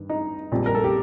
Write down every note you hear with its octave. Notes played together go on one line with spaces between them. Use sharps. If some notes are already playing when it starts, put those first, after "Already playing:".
Already playing: G2 D#3
D#4
A#1 A#2 G3 C4
A#4
A4
G4